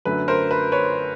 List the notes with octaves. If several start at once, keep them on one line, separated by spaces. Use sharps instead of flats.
F#2 D3 F#3 A3 B4
A#4 C5
B4
B4 C#5